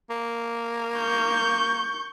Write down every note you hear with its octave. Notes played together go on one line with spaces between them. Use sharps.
A#3
C#6 G6